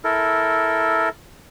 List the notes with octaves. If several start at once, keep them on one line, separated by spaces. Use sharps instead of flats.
E4 A4 A#4